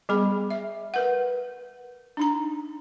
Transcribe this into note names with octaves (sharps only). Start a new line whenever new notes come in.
G3 B3 G#4 B5
E5
A#4 B4 F#5
D4 D#4 A#5